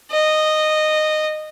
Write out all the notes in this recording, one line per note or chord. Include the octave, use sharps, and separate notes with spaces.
D#5